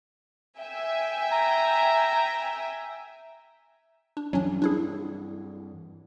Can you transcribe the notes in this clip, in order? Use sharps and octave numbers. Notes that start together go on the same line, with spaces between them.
E5 G5 G#5
A#5
D4
G2 E3 F#3 C#4 D4
D4 E4 G#4